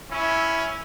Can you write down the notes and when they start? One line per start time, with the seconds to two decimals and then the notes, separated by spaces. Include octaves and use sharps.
0.11 C#4 E4